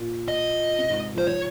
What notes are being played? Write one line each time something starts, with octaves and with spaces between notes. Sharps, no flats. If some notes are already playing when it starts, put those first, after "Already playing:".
Already playing: A#2
D#5
C3
G#2
F3
C5
F3 C#5